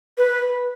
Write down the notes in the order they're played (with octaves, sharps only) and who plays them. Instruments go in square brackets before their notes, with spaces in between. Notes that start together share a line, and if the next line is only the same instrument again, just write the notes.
[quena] B4